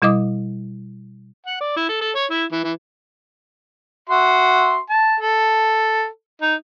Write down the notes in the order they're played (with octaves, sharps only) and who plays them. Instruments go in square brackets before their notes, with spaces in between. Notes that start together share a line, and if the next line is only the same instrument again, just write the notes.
[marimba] B2 G3 E4 D#5 D6 D#6
[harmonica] F#5
D5
E4
A4
A4
C#5
E4
E3
E3
F#4 E5 C6
A5
A4
D#4